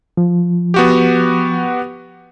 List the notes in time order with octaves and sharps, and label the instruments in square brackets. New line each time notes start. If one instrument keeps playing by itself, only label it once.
[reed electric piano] F3
[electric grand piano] B3 F#4 G4